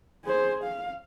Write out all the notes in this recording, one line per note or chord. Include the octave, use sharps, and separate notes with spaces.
G#4 C5
F5